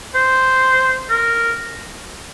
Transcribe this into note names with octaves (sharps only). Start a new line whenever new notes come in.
C5
A#4